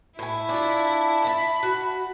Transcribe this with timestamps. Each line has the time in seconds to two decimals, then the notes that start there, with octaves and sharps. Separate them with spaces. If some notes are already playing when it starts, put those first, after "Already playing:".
0.19 A2 E4 G#5
0.49 D4 F4
1.25 E5 A5 B5
1.63 F#4